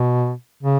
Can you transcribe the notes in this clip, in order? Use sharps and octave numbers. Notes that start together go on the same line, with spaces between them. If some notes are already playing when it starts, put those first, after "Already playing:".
Already playing: B2
C#3